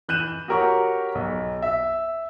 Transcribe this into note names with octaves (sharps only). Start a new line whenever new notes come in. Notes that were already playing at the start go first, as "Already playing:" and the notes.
E3 F#6 G6 D#7 E7
F#4 G4 A#4 C#5 C#6
B1
E5